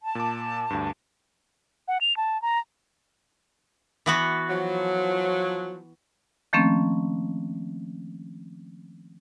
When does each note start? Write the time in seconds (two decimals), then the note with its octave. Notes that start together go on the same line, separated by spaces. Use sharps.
0.02 A5
0.15 A#2 D6
0.70 D2 G2
1.88 F#5
2.01 F7
2.17 A5
2.42 A#5
4.06 E3 B3 F#4
4.50 F3 F#3
6.53 D#3 F3 A3 A#3 C4 C#4